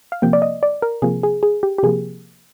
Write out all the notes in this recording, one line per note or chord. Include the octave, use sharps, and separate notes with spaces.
F5
C3 F3 A#3 G5
D5
D#5
D5
A#4
C3 F3 A#3 G#4
G#4
G#4
G4
G4
C3 F3 A#3 G#4